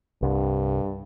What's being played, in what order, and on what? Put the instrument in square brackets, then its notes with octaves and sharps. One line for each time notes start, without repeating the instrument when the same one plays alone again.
[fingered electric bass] C2 [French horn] G2